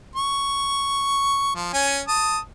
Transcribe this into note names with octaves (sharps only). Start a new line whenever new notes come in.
C#6
F3
C#4 G#5
A5 D#6